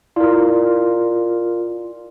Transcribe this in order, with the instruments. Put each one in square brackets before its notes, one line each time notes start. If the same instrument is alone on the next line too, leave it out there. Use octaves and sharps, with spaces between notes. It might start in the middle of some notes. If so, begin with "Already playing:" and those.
[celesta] E4 D5 [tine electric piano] F4 A#4